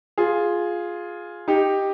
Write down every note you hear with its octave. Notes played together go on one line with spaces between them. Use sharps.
F4 G#4
D#4 G4